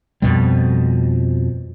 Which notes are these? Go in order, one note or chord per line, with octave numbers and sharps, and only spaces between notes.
F2 B2 G3